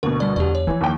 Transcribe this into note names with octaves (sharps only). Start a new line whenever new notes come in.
D2 B2 A#4
G3 D5
E2 G4 D5
C#5
E3 F3 E4
D#2 G5